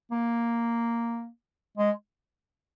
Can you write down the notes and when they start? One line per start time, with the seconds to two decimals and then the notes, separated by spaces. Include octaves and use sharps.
0.11 A#3
1.77 G#3